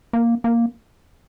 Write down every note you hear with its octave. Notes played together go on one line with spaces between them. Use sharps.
A#3
A#3